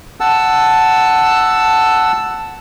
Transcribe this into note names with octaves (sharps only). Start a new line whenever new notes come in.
F#5 A5 E6